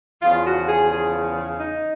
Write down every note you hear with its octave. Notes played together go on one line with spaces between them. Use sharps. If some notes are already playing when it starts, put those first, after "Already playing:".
E2 C#3 F3 F4
F#4
G#4
G#4
D#4